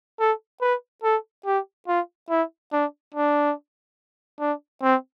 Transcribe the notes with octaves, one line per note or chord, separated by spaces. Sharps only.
A4
B4
A4
G4
F4
E4
D4
D4
D4
C4